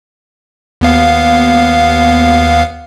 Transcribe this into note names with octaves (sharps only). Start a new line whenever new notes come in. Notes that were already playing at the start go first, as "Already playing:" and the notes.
D#2 B3 F5